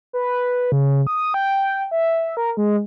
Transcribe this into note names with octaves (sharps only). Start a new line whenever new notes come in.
B4
C#3
D#6
G5
E5
A#4
G#3